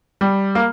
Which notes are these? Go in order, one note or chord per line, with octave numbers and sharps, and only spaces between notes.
G3
A#3